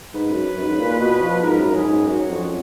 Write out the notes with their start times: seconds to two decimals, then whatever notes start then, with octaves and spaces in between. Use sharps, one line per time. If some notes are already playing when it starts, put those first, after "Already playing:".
0.14 G#2 B4
0.31 F#2
0.57 F#2
0.63 G#2
0.79 A#2
1.00 B2
1.22 F3
1.42 G#2 A#4
1.59 F#2
1.75 G#2 G#4
1.91 G#2
2.07 F#2 F#4
2.28 F2